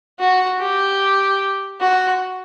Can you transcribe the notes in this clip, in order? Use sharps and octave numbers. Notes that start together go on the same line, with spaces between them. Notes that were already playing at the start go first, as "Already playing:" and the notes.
F#4
G4
F#4